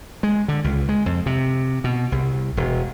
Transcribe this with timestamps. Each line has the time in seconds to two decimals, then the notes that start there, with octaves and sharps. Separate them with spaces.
0.23 G#3
0.48 D3
0.64 C#2
0.89 G#3
1.06 F2
1.26 C3
1.84 B2
2.12 C2
2.57 E1